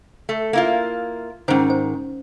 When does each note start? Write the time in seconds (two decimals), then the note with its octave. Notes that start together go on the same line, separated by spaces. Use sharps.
0.29 A3
0.53 A#3 E4 F4
1.48 G#2 D#3 C#4 C5
1.70 C5